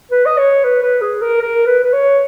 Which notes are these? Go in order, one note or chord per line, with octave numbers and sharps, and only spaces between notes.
B4
D#5
C#5
B4
B4
G#4
A#4
A#4
B4
B4
C#5